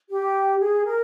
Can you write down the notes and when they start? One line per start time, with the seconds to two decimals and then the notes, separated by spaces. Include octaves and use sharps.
0.10 G4
0.60 G#4
0.85 A#4